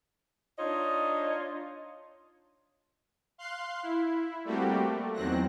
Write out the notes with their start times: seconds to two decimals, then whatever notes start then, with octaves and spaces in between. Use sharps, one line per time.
0.58 D4 D#4 F4 C#5 D#5
3.38 F5 C6 F#6 C7
3.83 E4
4.45 G3 A3 A#3 C4 F#4 G4
4.81 A3
5.14 E2 D#3 F#3 C4 F#6 A#6